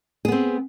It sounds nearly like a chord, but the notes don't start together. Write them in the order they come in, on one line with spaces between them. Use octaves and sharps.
G#4 B3 C4